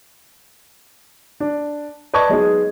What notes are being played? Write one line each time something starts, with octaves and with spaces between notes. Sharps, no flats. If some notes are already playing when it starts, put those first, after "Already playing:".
D4
B4 D5 D#5 A5 C#6 G#6
F#3 G#3 B3 D#4 G#4